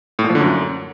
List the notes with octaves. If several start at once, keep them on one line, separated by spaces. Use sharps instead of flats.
A2
A#2
F3
D3
F#2